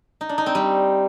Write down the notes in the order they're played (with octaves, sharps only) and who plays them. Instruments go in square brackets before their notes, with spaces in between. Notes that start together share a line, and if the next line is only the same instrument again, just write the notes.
[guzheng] D#4
D4
D#4
C4
G3